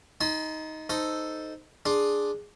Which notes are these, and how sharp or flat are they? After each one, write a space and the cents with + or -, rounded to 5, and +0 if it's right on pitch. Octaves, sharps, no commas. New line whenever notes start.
D#4 +10 A5 -35 C6 -30
D#4 +0 A4 +0 C5 -10
D4 +0 G#4 -5 C6 +10